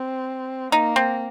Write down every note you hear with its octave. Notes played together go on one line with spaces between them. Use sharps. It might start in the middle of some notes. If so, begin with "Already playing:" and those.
Already playing: C4
A#3 D#4
C4